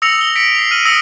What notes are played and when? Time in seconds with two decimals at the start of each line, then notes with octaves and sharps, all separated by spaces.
0.02 D#6 E6 A#6 C#7 F7
0.21 G7
0.35 B6 C#7 D7
0.55 C7 F7
0.71 F6 D#7 F#7
0.85 D#6 E6 A#6 C#7 F7 F#7